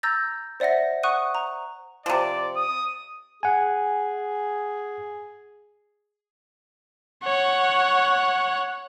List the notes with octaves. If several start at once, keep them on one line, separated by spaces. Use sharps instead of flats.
A#5 E6 G6 A6 A#6
C5 D5 E5 F#5 A#6
F#5 C#6 D#6 F#6 D#7
A#5
C3 F3 D5
D#6
G#4 F#5 G#5
C#5 F#5